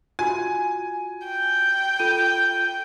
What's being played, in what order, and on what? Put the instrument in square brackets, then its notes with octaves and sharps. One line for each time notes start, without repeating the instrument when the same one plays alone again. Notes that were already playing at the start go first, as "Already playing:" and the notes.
[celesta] F4 F#4 [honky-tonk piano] G#5
[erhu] G5
[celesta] F4 A4 D#7